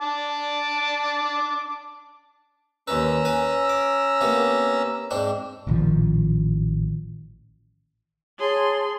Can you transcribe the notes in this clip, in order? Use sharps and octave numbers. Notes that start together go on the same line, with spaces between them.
A5 D6
D#2 C#4 B4 A#5 E6
B4 G#5
D6
C3 A#3 B3
G#2 C4 D4
A1 A#2 D#3 F3
G#4 C#5 A5 C6